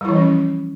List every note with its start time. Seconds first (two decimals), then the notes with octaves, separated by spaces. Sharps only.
0.01 G3
0.05 E4
0.09 E3
0.13 F3
0.16 C#4